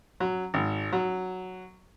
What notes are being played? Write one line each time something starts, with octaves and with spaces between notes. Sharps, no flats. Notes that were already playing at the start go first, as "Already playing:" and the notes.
F#3
G#1
F#3